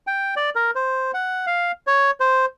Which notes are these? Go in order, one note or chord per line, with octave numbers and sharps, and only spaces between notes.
G5
D5
A#4
C5
F#5
F5
C#5
C5